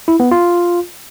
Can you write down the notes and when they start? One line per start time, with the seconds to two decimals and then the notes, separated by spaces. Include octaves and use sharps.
0.08 E4
0.20 B3
0.31 F4